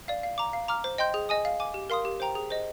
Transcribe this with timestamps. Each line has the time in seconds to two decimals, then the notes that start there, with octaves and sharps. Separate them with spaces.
0.08 D5 F5
0.23 F5
0.38 A#5 D6
0.53 F5
0.68 A#5 D6 F6
0.84 C5
0.98 D#5 G5 C6 G6
1.14 G#4
1.29 D#5 G#5 D#6
1.45 F5
1.60 G#5 D6
1.74 G4
1.90 A#4 F5 C6 D#6
2.05 G4
2.20 C5 G5 A#5
2.35 G#4
2.51 C5 D#5